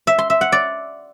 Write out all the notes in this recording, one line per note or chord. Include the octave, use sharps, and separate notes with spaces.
E5
C6
E5
F#5
D5